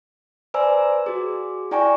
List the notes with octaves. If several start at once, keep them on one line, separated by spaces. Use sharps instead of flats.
B4 C5 D5 G#5 A#5 E6
F#4 G#4
E4 D5 G5 G#5 A#5 C#6